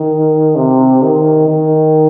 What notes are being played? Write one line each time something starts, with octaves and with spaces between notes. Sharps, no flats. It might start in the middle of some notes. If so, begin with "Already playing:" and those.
Already playing: D#3
C3
D#3
D#3